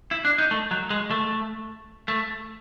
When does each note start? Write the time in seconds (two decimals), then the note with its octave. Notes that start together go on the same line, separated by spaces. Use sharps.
0.11 E4
0.25 D4
0.38 D#4
0.51 A3
0.71 F#3
0.90 G#3
1.11 A3
2.08 A3